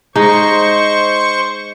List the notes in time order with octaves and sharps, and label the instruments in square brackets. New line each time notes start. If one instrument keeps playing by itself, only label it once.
[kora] G#3 D#4 [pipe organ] C5 C#6